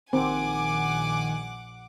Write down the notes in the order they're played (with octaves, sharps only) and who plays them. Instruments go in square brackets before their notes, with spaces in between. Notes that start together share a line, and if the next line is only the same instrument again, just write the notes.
[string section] A#1 F#5 D6 [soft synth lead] D#3 [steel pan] C4 [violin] G#5